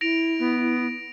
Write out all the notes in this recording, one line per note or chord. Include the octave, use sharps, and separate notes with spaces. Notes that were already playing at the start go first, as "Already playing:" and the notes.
E4 A#6 D7 F7
B3